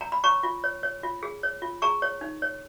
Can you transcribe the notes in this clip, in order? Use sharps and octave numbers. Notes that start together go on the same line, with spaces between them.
A#5
B5
C#5 A#5 C#6
F4
C#5
C#5
F4
G#4
C#5
F4
G#4 A#5 C#6
C#5
D#4
C#5